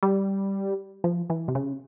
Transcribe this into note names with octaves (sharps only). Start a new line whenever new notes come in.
G3
F3
E3
C3
C#3